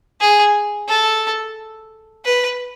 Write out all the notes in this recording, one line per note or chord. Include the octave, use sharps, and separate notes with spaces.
G#4
A4
B4